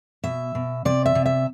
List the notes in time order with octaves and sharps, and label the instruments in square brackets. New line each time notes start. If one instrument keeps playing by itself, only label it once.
[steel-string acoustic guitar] B2 E5
B2
C3 D5
E5
C3
E5